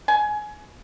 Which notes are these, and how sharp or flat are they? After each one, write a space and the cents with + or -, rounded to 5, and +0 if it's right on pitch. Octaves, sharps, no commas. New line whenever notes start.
G#5 +20